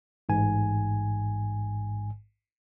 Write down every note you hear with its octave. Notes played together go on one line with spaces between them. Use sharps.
A1 G#2 G#5